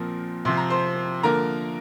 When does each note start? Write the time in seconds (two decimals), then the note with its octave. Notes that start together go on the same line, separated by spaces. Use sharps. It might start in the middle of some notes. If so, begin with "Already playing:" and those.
Already playing: A#2 F3 C4 A#4
0.45 C3 F3 C4 C6
0.57 A#5
0.70 C5 C6
1.23 D3 F3 A#3 A#4 A#5